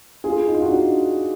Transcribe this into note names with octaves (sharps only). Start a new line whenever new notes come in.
F4 G#4
D#4
F4
D#4 F#4
D4